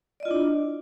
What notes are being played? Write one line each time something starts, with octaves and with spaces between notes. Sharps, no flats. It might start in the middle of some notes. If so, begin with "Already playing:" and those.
D4 E4 F4 D5 D#5